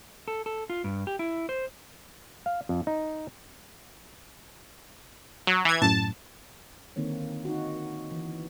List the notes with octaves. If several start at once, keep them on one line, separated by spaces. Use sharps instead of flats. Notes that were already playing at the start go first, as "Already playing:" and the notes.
A4
A4
F4
G2
G4
E4
C5
F5
F2
D#4
F#3
E3 G#6
F#2 A2 A5
D3 D#3 A#3 C4 C#5
D#4 F#4
E3